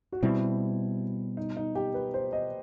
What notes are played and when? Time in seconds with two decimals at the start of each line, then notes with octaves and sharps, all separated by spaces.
0.12 F#4
0.23 B2 G3 C4 E4
1.37 D#4
1.57 D#4
1.75 G4
1.94 B4
2.14 C5
2.32 D#5